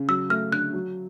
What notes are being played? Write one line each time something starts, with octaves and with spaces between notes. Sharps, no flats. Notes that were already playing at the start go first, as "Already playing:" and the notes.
Already playing: C#3
F#3 E6
A3 F6
D3 F#6
F#3